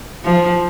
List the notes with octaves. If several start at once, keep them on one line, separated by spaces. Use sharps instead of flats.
F3